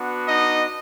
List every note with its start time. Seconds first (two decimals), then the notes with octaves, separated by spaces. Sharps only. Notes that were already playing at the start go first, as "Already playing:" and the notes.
Already playing: B3 D4 F#4
0.28 D#4 D#5